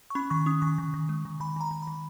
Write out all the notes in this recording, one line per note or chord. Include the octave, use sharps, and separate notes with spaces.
C#6
C#4 B5
D#3 C#6
C#4 D#6
D#3 C#6
D#3
D#3
G#3
D#3
D#3 B5
D#3 A#5
D#3
B5
D#3